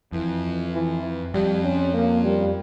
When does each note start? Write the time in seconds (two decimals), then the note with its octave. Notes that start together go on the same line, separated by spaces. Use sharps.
0.12 F2 E3
0.74 E3
1.34 F2 G3
1.64 C#4
1.94 A#3
2.24 G3